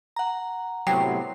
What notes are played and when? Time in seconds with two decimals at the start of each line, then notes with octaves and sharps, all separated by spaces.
0.16 F#5 A#5
0.87 A2 C3 F#3 B3 G5 C7